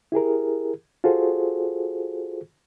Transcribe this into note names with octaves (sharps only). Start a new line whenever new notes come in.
E4 G4 G#4 A#4
F4 F#4 G#4 A4 C5